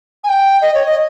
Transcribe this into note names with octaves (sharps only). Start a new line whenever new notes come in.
G#5
G5
D#5
C#5
D#5